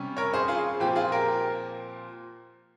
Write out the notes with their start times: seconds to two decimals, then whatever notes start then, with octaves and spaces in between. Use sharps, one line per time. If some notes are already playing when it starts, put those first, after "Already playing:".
Already playing: C3 G3 C#4
0.17 A#4 C#5
0.34 G#4 C5
0.48 F4 G#4
0.80 A#2 F3 C4 G4
0.95 F4 G#4
1.12 G4 A#4